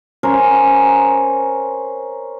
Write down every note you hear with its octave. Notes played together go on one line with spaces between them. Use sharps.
C#4 A#4 C5